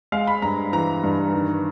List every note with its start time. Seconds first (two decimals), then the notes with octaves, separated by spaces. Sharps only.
0.12 G#3 F5
0.27 B5
0.42 G2 A#5
0.73 E3 A#5
1.03 G2
1.34 D#3